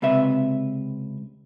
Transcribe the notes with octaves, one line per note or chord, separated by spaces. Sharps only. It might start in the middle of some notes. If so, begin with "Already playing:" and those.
C#2 C3 B4 E5